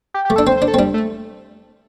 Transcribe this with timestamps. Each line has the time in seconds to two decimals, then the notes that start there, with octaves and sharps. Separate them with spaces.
0.14 G4
0.25 G4
0.30 A3
0.36 A4
0.38 D4
0.47 C4 C5
0.57 C5
0.62 D4
0.68 A4
0.74 C4
0.78 G3 D4
0.94 A3